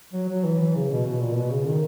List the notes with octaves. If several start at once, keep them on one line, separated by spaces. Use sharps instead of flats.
F#3
F#3
E3
E3
C#3
B2
B2
A#2
B2
C#3
D#3